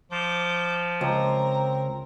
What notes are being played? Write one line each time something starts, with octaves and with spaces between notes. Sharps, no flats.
F3 D6 G6
C#2 C4 A#4 A#5